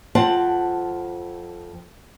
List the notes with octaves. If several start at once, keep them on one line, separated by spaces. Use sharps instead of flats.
F2 C4 F#5 A5